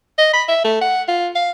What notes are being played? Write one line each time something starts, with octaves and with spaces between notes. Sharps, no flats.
D#5
B5
E5
A3
F#5
F4
F5